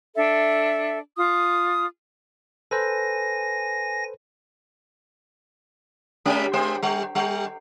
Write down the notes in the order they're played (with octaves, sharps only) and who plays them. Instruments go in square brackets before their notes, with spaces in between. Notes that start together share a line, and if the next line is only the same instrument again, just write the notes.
[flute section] D4 A4 E5
F4 D#6
[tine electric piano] A4 B4 C5 [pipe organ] G#5 A#6
[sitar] G3 G#3 C#4
G#3 C5
G3
G3